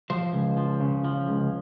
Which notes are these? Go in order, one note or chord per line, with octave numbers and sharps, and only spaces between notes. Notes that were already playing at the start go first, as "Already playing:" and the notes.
F3 C5
C#2
F3
C#3
F3
C#2